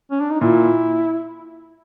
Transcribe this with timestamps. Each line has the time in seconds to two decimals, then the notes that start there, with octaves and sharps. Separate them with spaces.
0.11 C#4
0.20 D4
0.31 D#4
0.40 A#2 E4